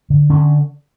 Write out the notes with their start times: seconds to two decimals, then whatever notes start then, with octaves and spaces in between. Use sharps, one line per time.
0.10 D3
0.30 D3 C#4